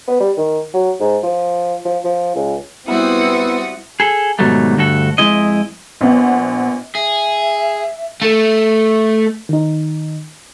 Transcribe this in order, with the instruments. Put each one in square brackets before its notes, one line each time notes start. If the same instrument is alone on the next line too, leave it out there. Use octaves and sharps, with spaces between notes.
[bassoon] B3
G3
D#3
F#3
G#2
F3
F3
F3
C#2
[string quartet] G3 F#4 D#6 [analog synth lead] B3 [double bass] C4 E4 [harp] E5
[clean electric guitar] G#4 A4
G#2 B2 D#3 F#3 G3 A3
D2 G2 F#4 A4
F2 G#3 E4 D#5
[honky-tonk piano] A#1 B3 F#5
[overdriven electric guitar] G#4 [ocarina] E5
[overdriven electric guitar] A3
[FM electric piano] D#3 D#4